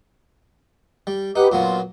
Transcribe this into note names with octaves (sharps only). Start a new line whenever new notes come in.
G3
D#4 G4 B4 F#5 D6
A#2 F#3 B3 F4